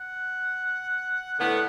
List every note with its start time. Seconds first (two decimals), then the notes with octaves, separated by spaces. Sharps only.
0.01 F#5
1.40 A2 D3 B3 F#5